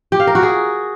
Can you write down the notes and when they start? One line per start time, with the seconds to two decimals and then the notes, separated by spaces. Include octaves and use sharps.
0.12 G4
0.20 F5
0.27 A#4
0.35 F#4
0.43 G#4